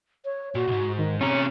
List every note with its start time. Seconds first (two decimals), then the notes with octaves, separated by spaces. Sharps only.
0.25 C#5
0.55 A#2 F#4
0.67 B1 G#2
0.98 D#3
1.21 C3 C#4 F4 C#5 A#5